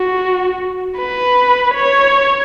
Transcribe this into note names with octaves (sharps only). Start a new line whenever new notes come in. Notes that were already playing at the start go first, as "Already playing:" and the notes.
Already playing: F#4
B4
C#5